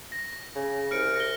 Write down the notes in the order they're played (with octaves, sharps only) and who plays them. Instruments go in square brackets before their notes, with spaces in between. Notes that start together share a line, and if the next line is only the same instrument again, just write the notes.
[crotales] A#6
[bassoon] C#3
[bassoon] C2 [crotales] F6 C#7 D7
[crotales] A#6 G7